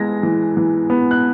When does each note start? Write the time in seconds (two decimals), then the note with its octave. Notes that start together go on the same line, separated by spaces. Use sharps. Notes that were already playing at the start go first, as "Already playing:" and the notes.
Already playing: E3 G#3 B3 A#6
0.23 E3
0.57 E3
0.90 B3
1.11 F#6